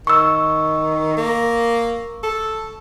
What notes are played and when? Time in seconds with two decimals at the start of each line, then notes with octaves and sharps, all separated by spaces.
0.07 D#3 C#6 E6
1.17 A#3
2.23 A4